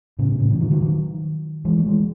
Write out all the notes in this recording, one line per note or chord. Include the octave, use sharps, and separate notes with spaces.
A2 C#3
A2 C#3
C#3 E3
D#3 F#3
D#3 F#3
D#3 F#3
E3 G#3
A3
E3 G#3